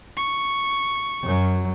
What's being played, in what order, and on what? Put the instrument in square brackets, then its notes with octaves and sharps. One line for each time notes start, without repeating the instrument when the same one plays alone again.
[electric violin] C#6
[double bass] F#2 F#3